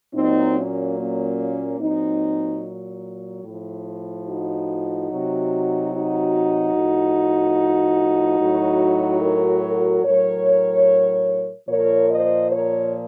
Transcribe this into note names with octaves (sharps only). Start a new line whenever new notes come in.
A#2 F#3 C4 D#4
A#3 C#4
A#3 C#4
A#2 F#3 C4 D#4
A2 F3
D#4 F#4
C3 F#3
D#4 F#4
A2 F3
A2 F#3
F#4 A#4
F#4 A#4
A2 F#3 A#4 C#5
A#2 F3 A#4 C#5
C5 D#5
A#4 C#5